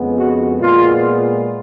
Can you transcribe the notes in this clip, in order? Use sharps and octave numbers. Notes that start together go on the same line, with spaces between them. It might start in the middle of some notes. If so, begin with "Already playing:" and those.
Already playing: F2 C#3 G#3 B3
F#4
A#2 G#3 B3 F4